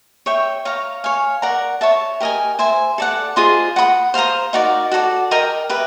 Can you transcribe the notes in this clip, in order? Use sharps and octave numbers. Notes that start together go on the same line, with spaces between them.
C#5 E5 G5
C#5 F5 A#5
C#5 F5 G#5
A#4 D5 F#5 A#5
C#5 E5 A5
G4 A#4 D#5 G#5
C5 E5 G#5
A4 D5 F#5
F4 G#4 C5 D#5
D5 F#5 B5 D#6
C5 F5 A#5 D#6
D#4 F#4 A#4 D5
F#4 A4 D5
A#4 D#5 G5 A#5
G4 B4 E5